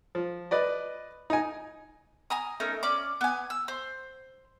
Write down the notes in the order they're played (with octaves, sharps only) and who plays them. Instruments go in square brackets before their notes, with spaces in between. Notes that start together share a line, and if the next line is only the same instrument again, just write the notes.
[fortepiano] F3
B4 D5 D#5
D#4 G#5
[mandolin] G#5 A#5 D#6
A3 C#4 D#4 A#4
C#4 D5 D6
B3 G#5
E6
C5